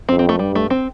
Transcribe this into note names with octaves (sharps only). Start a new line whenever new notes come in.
F2 C4
C4
A3
G2 G3
A3
C4